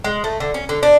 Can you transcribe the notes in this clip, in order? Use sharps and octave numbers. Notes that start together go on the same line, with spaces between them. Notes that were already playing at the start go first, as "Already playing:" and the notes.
G#3
A3
D3
C#4
D3
D4